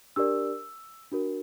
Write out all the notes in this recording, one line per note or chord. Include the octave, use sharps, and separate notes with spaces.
D4 G4 A#4 D5 E6
D4 F#4 A#4